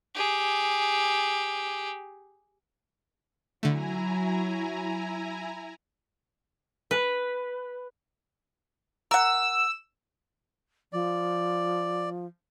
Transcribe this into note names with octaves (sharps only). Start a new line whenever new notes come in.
G4 G#4
D3 F#3 A3 E4 G#5 A#5
B4
A#4 F#5 E6
F3 D5